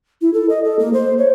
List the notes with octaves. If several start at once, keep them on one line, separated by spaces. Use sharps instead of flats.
E4
A4
D#5
A4
A#3
C5
C#5